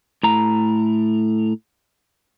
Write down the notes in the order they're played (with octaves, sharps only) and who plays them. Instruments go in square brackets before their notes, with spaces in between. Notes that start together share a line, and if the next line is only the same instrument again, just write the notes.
[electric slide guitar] A2 A#5